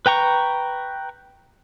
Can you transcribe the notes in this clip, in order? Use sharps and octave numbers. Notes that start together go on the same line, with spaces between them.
B4 G5 A#5 C#6